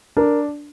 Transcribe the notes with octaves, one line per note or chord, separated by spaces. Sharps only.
D4 A#4